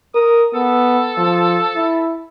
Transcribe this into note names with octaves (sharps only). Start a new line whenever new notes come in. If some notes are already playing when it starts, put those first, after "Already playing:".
A#4 D#6
B3 A4
F3
E4